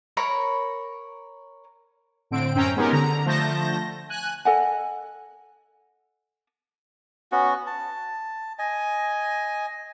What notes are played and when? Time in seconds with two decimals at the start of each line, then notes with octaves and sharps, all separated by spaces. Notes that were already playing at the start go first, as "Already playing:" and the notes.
0.17 A#4 C#5 B5
2.31 A2 D3 C4 D7
2.54 F#2 C4 C#4 G5 A#5
2.76 G#3 B3 C#4 D#4 G4 A#4
2.92 D3 A#5
3.25 D3 F3 A3 A5 G6 A#6
4.09 G#5 F#6
4.45 A4 D#5 F#5 G#5
7.32 B3 C#4 F#4
7.67 A5
8.59 D#5 G#5